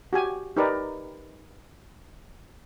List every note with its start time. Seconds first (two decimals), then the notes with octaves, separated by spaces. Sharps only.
0.13 F#4 G4 G#5
0.56 D#4 G4 A#4 B4 D5